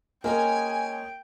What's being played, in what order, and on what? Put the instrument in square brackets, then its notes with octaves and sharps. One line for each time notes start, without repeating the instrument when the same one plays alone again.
[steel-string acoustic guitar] G#3 C#4 G#4 [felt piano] A#3 A#4 [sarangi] G5 [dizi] G#5